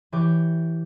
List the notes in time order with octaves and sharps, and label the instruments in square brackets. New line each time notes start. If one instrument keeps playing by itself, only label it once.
[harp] E3 G4 C#5 D6 G6